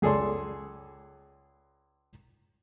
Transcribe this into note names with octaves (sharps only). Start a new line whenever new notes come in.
C#2 G#4 A4 D5 C6